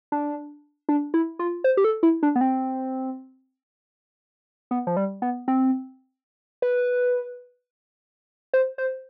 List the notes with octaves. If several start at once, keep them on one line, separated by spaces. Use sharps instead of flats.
D4
D4
E4
F4
C5
G4
A4
E4
D4
B3
C4
B3
F3
G3
B3
C4
B4
C5
C5